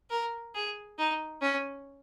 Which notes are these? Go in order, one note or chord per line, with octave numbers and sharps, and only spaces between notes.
A#4
G#4
D#4
C#4